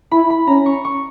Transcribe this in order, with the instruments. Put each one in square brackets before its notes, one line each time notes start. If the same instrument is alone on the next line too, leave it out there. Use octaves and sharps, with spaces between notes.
[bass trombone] E4 [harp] B5
[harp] B5
[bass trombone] C#4 [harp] A#5
[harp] C#6
C#6